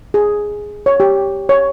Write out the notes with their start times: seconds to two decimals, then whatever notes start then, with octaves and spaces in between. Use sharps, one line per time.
0.14 G#4
0.86 C#5
1.00 G4
1.49 C#5